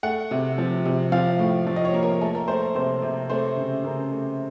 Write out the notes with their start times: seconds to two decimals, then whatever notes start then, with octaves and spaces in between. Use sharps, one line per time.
0.03 A3 F#5
0.31 C3
0.58 F3
0.85 C3
1.12 F3 F5
1.39 A2
1.67 F3
1.76 D#5
1.85 C#5
1.94 A#3
2.03 A#4
2.21 A3 A4
2.35 A#4
2.48 A3 C5
2.62 A#4
2.75 C3 C5
3.02 C3
3.30 A3 C5
3.57 C#3
3.84 C#3 A#4
4.11 A3